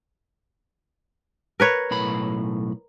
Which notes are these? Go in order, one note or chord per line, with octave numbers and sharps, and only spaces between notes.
A#4 B4 C#5
B1 A2 B5